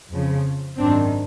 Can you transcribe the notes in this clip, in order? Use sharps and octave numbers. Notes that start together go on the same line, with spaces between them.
F2 C#3 F3
G#1 F#2 D#3 F#3 C4 D4